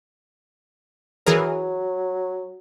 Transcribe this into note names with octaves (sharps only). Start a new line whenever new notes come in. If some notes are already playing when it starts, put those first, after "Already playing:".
E3 F#3 G#4 A#4